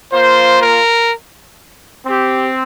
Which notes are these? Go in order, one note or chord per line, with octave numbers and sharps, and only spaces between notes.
A#3 F4 C5
A#4
C4 G4